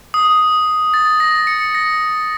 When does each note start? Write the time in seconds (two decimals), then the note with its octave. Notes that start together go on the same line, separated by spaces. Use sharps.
0.14 D#6
0.94 A6
1.20 A#6
1.47 C#7
1.75 A#6